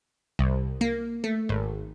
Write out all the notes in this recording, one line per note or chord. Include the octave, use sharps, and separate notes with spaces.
C2
A#3
A3
G#1